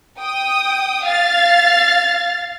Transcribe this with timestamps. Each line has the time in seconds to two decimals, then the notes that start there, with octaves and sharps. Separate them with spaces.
0.19 G5 D#6
1.02 F5 A6